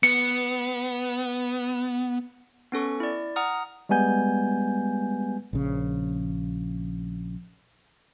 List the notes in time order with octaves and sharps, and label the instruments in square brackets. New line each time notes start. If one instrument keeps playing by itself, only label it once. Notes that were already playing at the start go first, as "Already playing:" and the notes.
[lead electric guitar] B3 [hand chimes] C#7
[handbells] B3 C#4 A4 C#6
E4 D5
F#5 A#5 D#6 F6
[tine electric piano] G3 G#3 B3 G#5 G6
[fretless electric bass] A#1 C#3